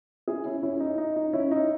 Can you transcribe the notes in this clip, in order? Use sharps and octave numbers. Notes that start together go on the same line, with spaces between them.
E4 G#4
C#4 E4
C#4 E4
D#4
D#4
D#4
C#4 E4
D#4